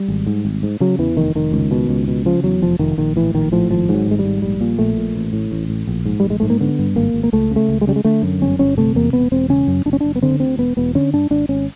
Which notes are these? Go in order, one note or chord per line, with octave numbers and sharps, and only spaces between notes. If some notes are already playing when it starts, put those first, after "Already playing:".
Already playing: G3
G#1
G#2
G#1
G#2
C#3 F#3
E2 E3
F1 D#3
F1 D#3
C#2
B2
C#2
B2
C#3 F3
E2 F#3
F1 F3
F1 D#3
A#1 D#3
A2 E3
A#1 D#3
A2 F3
G#1 F3
G#2 F#3
G#1 G#3
G3
G#2
A#1 G3
A#2
A#1 A3
A#2
A1
A2
A1
A2
A#1
G#2
A#1 G3
G#3
G#2 A3
A#3
D3 B3
G2
G#1 A#3
G#1
A#3
C#2 A3
C#3
A3
C#2
G#3
C#3 G3
G#3
D3 A3
F#2
G1 C#4
G1 C#4
C3 A3
E2 A#3
E1 B3
E1 C4
C#3 C#4
F#2
F#1 D4
C#4
F#1 D4
B3
D3 C4
D2 C4
E1 B3
E1 B3
D3 C#4
G2 D4
G#1 D4
G#1 C#4